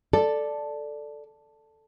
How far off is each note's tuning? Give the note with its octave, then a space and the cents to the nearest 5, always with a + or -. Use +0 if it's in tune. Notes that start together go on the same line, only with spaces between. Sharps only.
A4 +0 D5 +5